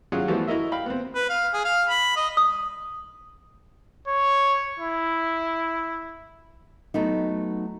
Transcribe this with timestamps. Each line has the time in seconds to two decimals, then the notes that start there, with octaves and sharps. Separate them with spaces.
0.12 F#3 C#4 F4 G#4 F#5
0.28 E3 F3 G3 A3 B3 F#4
0.47 E4 F#4 A#4 D#5 E5
0.72 F5 G5 B5
0.86 B3 C4
1.15 B4
1.29 F5
1.53 G#4
1.65 F5
1.89 B5
2.17 D#5
2.37 D#6
4.08 C#5
4.79 E4
6.94 F#3 A3 B3 D#4